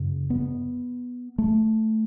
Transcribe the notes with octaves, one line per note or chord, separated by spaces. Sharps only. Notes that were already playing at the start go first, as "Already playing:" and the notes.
Already playing: F#2 C#3
B3
A3